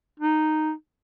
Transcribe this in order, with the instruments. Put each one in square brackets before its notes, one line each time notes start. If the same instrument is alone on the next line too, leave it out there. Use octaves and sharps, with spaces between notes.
[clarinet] D#4